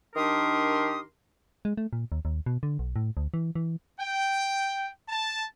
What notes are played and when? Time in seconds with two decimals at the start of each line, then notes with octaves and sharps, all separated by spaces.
0.16 D#3 D4 G4 A#4 C6 D#6
1.65 G#3
1.77 A3
1.93 A#2
2.12 D#2
2.25 D#2
2.46 B2
2.63 D3
2.79 B1
2.96 A2
3.17 D2
3.34 E3
3.55 E3
3.99 G5
5.09 A5